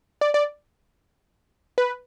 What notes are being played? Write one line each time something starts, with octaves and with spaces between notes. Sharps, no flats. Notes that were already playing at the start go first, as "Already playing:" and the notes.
D5
D5
B4